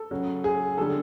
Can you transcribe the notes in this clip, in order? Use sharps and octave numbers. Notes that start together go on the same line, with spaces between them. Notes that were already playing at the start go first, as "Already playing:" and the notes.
Already playing: A4
C#3 F#3
G#4
D3 G3 A4